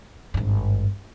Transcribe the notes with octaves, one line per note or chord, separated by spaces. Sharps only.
G#1 G2